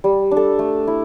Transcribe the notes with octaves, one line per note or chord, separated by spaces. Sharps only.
G3
D4
A4
A3
E4